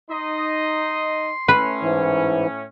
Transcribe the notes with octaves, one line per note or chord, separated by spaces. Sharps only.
D#4 D#5 C6
A2 C#4 B4
G#2 E3